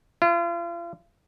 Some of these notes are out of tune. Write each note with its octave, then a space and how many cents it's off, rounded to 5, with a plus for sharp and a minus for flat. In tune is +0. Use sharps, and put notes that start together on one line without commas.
F4 -40